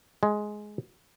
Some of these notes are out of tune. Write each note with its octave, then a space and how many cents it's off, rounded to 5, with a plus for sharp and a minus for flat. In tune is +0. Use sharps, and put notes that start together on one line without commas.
G#3 +10